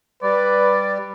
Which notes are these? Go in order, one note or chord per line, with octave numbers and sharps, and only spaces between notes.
G3 B4 D5